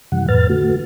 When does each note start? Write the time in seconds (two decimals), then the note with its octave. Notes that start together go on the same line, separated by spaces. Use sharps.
0.12 F#2 C3 E3 G3 F#5
0.29 F2 A2 B4 F6 A6
0.49 D3 A3 F#4